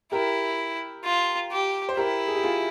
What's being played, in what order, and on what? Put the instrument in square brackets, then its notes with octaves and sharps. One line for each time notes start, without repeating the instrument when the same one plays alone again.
[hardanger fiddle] E4 [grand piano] G4 A#4
[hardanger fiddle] F4
G4
[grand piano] C5
[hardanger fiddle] E4 [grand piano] G4 A#4
[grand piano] G#4
G4
F4 G#4